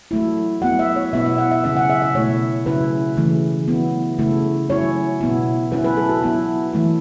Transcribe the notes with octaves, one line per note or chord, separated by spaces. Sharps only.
F#3 A3 E4
F#3 B3 E4 F#5
E5
C#5
B2 B3 E4 E5
E5
F#5
E5
C#3 F#3 C#4 E4 E5
F#5
E5
E5
B2 A3 E4 C#5
C#3 F#3 C#4 E4 B4
C#3 E3 A3
F#3 B3 E4
C#3 A3 E4
F#3 C#4 E4 C#5
B2 B3 E4
F#3 C#4 E4 B4
B4
A4
F#4
F#3 B3 E4
E3 A3 E4